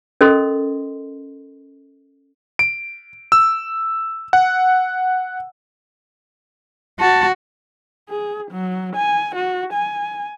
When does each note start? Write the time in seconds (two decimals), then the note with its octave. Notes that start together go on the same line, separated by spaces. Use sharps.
0.21 C#4 A4 A#4 D#5 C6
2.59 D7
3.32 E6
4.33 F#5
7.00 F#4 A5
8.09 G#4
8.51 F#3
8.96 G#5
9.35 F#4
9.73 G#5